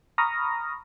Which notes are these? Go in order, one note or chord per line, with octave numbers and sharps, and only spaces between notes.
A#5 B5 C#6 D#6 F6 A#6